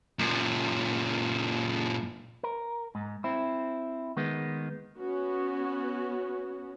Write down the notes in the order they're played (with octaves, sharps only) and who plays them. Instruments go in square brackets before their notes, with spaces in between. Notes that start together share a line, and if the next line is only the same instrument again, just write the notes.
[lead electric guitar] F#2 A#2
[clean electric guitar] A#4
G#2
C4 E4
D#3 G#3 B3
[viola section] B3 C#4 F#4